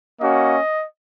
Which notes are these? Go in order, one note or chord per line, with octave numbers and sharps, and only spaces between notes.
A#3 C#4 F#4 D#5